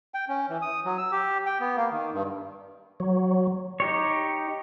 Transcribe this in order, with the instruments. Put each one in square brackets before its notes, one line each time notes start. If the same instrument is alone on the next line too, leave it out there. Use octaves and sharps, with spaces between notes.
[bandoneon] G5
C#4
E3
D#6
F#3
E6
G4
G5
B3
A#3
D#3
G2
[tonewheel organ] F#3
[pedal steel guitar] D#4 G4 C#5